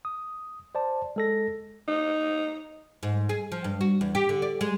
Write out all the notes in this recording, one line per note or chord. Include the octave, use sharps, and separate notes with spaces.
D#6
C5 D5 A5
G#3 A4 A#6
D#4
G#2
G#4
F3
G2
F#4
E2
G4
D3
D5
G#3